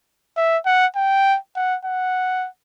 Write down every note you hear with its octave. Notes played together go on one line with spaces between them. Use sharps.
E5
F#5
G5
F#5
F#5